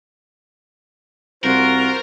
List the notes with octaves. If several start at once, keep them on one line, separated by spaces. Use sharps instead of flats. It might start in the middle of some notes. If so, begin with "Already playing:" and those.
C2 F4 F#4 A#4 C5